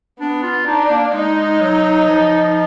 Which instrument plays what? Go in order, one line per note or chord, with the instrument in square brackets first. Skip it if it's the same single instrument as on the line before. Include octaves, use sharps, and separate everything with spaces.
[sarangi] B3 [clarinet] D4
[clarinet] F4
[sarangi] D4 [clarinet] D#4
[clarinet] A#3
[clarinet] G#3 [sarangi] D#4
[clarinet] F#3
F3